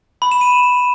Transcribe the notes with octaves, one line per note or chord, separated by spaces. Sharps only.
B5
E7
D#7